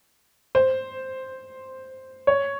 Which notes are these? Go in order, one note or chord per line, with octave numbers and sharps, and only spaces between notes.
C5
C#5